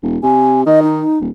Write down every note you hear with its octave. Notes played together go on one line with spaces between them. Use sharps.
E1
C3 G#5
D#3 D#5
D#4
D#1